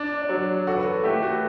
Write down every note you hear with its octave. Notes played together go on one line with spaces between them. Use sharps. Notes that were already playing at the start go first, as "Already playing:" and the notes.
Already playing: D4 D5
D5
F#3 C#5
F#4 A4
B4
A4
A3 G4
F#4